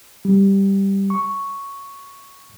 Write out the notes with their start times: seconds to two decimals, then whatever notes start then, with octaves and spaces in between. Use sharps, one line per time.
0.25 G3
1.10 C#6